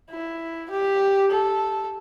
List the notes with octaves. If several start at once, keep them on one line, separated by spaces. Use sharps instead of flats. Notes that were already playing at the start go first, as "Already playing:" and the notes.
E4
G4
A4